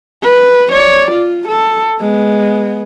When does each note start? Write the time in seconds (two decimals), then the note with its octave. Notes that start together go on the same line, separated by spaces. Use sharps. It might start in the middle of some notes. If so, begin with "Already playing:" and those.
0.23 B4
0.72 C#5 D5
1.11 F4
1.48 A4
2.00 G#3 B3